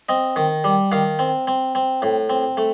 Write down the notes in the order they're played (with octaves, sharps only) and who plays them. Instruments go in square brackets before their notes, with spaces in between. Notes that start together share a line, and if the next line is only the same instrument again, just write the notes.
[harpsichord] C4 D#5
D#3
G3
D#3 F5
C4
C4
C4
A2
C4
A3